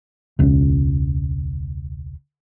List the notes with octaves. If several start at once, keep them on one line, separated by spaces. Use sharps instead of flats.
E1 C#2